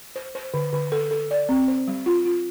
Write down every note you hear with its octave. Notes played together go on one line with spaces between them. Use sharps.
C5
C5
D3
D3
A4
A4
D5
C4
C5
G3
F4
F4